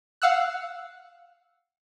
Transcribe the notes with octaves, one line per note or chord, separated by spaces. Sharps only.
F5 F#5 E6 F#6